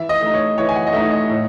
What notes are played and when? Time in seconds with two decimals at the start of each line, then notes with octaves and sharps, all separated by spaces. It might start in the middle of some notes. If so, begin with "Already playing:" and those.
Already playing: E3 E5
0.09 D#5
0.21 A3 D#4
0.34 C#5
0.58 E3 C#5
0.69 G#5
0.75 F#5
0.87 D#5
0.93 A3 D#4 E5
1.11 D#5
1.29 A2